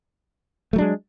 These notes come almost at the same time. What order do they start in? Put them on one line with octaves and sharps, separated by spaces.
A3 F#3 D4 G#3